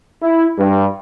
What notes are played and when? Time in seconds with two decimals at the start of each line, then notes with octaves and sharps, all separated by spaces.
0.23 E4
0.58 G2